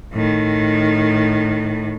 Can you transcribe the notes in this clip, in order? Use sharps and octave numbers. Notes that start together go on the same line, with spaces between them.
A2 D#3